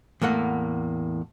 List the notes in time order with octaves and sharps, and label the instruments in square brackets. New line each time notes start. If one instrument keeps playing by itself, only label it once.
[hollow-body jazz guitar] E2 A2 A#3 F#5